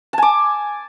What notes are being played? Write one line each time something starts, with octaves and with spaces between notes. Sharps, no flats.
G#5 A5 D6